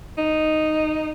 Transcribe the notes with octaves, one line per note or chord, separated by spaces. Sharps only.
D#4